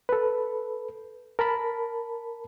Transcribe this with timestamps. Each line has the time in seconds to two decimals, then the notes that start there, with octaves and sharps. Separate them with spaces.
0.09 A4 B4
1.39 A#4 A5 B5